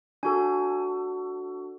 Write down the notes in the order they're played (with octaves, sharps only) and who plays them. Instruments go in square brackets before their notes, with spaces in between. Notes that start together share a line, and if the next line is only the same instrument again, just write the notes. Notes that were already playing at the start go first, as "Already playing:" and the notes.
[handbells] D4 F#4 A4 G#5